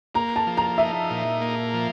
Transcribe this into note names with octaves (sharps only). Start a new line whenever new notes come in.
A#3 A#5
A5
F3
A#5
D#4 E5
A#2
A#3
F3